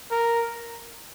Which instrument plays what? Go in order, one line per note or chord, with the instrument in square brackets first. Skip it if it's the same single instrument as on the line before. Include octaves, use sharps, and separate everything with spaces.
[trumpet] A#4